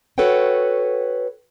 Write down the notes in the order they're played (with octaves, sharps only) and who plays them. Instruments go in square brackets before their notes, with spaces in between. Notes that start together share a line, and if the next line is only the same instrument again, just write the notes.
[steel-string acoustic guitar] F#4 A4 B4 C#5 F#5 G5